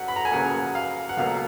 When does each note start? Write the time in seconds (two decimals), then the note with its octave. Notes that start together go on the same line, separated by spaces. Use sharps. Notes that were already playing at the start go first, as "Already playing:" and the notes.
Already playing: F#2 F#3 F#5
0.08 B5
0.16 A#5
0.25 G#5
0.32 F#2 C#3 F#3 A#3 F#5
0.75 F5
1.09 F#5
1.17 C#2 B2 F#3 A#3 F5